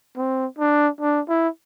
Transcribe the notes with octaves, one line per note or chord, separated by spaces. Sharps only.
C4
D4
D4
E4